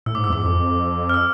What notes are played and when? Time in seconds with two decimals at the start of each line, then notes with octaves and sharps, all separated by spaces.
0.06 A2 E6
0.15 G#2 D6
0.24 E6
0.29 E2 D6
0.42 F2
1.09 F6
1.14 E6